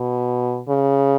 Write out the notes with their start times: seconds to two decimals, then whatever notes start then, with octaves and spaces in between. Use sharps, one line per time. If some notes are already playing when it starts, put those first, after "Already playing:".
Already playing: B2
0.69 C#3